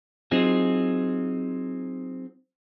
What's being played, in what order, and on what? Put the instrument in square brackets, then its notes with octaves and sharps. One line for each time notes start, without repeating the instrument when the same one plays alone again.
[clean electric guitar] F#3 C4 D#4 F4 G#4